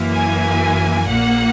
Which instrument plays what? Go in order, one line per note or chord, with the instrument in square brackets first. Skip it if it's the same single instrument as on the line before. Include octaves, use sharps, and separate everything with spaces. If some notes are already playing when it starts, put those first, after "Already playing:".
Already playing: [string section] F#2 E3 A#3
G#5
A#1 A#2 A#3 F#5